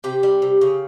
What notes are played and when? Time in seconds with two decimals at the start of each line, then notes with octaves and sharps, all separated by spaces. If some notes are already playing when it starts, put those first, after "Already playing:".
0.04 C3 G4
0.23 G3
0.42 C3
0.61 C#3